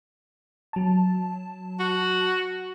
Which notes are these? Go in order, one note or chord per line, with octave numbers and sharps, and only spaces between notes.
F#3 A5
F#4